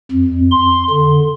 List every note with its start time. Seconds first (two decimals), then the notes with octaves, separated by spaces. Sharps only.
0.11 F2
0.51 C6
0.90 D3